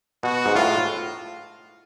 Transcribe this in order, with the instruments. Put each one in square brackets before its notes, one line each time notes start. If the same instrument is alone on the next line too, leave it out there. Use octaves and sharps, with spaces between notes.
[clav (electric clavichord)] B2 [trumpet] F#4
[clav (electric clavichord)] G#2
[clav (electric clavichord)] A2 [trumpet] F4